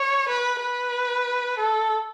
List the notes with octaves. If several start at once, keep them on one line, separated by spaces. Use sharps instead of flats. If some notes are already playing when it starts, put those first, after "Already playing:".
Already playing: C#5
B4
B4
A4